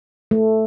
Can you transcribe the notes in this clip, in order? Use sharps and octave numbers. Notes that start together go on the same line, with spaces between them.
A3